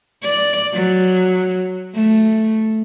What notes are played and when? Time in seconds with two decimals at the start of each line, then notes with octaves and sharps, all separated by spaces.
0.23 D5
0.73 F#3
1.95 A3